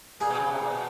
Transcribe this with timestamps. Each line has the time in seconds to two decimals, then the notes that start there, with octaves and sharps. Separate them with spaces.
0.21 A#2 G#4
0.30 B2
0.40 C#3
0.51 C3
0.61 A#2
0.70 B2